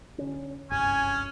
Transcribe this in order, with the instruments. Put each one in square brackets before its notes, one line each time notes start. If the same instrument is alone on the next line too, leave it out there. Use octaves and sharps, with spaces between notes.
[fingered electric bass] D3 C#4
[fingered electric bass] F#1 C2 G2 [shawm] C#4 [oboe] G#5